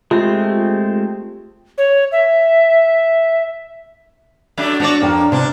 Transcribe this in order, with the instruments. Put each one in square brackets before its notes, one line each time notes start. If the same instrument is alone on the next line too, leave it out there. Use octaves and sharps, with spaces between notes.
[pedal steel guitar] G#3 A3 C4 [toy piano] F4 [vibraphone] G4
[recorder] C#5
E5
[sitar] F#3 A3 D4
[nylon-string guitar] D4 [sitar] F#4 C#5 D5
[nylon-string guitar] F2 D4 G5 [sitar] A#3
[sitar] G2 D4 [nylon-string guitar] C3